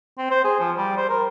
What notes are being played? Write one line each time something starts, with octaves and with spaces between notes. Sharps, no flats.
C4
C5
G#4
F3
G3
C5
A#4